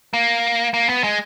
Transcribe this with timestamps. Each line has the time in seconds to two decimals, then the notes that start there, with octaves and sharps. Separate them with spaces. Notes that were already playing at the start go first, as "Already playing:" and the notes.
0.14 A#3
0.74 A#3
0.89 B3
1.04 G#3